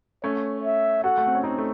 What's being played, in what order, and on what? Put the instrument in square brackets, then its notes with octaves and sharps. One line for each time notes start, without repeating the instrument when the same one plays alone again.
[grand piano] A3 C#4 [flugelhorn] C#5
[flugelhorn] E5
[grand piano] F#4 A4 [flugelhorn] F#5
[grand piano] A3
C4
C#4
C4 D#4
A3